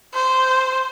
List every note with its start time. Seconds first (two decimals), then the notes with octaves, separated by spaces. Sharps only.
0.15 C5